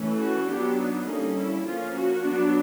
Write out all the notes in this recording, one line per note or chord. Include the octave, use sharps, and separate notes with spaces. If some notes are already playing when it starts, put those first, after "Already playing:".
Already playing: E3 A3 C#4
F#4
F#3 B3 D4 G4
D#4
D3 G3 A#3 C#4
E4
F3 A#3 C#4 F4
F#4
F#3 B3 D4